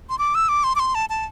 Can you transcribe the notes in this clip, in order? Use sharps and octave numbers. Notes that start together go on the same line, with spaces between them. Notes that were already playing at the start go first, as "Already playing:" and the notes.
C6
D6
E6
D6
C6
D6
C6
A5
A5